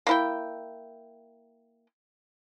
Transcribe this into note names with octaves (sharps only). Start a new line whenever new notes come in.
A#3 E4 G5